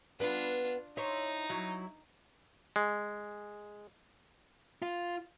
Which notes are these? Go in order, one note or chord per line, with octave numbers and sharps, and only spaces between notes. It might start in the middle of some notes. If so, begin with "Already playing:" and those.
B3 D4 F4 B4
D#4 E4 C5 C#5
F#3 E4
G#3
F4